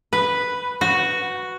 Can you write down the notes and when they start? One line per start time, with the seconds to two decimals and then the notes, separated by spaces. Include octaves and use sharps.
0.13 B4
0.81 F#4